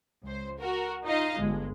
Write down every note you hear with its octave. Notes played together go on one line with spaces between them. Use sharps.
C#2 C5
F#4 A#4
D#4 F4 D#5 F5
G1 G#3